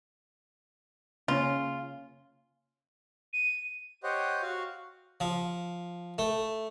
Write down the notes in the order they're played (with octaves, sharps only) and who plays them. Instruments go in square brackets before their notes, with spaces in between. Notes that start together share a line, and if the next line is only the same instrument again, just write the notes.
[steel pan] C#3 A#3 C#4 [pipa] F4
[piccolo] D#7
[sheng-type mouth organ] G4 C5 C#5 D#5 F#5
F#4 F5
[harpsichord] F3
A3